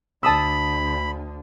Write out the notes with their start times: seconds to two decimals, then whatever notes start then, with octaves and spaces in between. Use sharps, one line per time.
0.23 D2 D3 A5 B5 D#6 E6